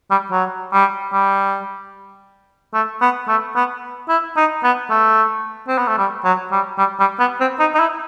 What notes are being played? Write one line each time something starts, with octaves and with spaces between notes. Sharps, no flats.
G3
F#3
G3
G3
A3
B3
A3
B3
E4
D#4
B3
A3
C4
B3
A3
G3
F#3
G3
G3
G3
B3
C4
D#4
D#4
E4